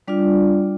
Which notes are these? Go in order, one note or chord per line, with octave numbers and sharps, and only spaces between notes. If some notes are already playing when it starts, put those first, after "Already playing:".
G3 D4 F4 D5